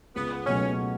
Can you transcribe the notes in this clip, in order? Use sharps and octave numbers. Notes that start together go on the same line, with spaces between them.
C#2 B3
B2 F#3 A3 C#4